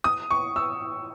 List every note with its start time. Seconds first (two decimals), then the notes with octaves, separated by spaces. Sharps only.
0.04 D#6
0.31 C#6
0.56 E6